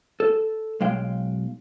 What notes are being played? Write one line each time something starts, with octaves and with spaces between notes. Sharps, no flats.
A4
B1 G#3 F5 G5